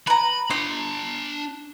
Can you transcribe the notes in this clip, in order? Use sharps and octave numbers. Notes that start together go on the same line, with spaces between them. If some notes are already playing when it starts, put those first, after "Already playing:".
B4 A#5 B5
D4 A#5 C6